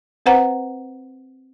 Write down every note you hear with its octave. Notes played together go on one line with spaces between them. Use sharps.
C4 B4 C5 F#5 A#5